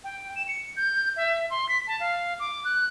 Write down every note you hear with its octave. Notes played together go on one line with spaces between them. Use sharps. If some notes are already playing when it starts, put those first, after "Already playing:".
G5
E7
C#7
G6
E5
C6
B6
A5
F5
D6
F#6